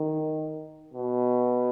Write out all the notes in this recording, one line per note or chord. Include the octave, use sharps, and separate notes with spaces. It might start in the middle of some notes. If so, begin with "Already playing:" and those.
Already playing: D#3
B2